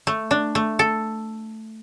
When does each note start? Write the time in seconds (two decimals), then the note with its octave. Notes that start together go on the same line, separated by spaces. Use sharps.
0.07 A3
0.31 D4
0.55 A3
0.79 A4